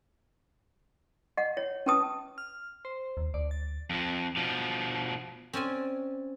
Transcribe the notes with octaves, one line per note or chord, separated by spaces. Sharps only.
D#5 F#5
C#5
C#4 B4 A5 D#6
F6
C5
D#2
D2 D5
A6
F2 F3
B2 F3
C4 C#4 D5 G#5